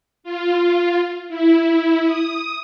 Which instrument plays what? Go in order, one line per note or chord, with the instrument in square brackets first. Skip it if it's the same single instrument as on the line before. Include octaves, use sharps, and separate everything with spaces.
[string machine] F4
E4
D#6